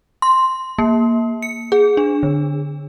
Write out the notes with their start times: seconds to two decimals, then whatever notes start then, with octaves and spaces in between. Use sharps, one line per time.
0.22 C6
0.79 A#3
1.42 C#7
1.72 G#4
1.97 D4
2.23 D3